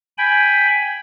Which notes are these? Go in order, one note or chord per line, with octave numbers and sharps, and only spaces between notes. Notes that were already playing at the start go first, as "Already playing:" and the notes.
G5 G#5 B5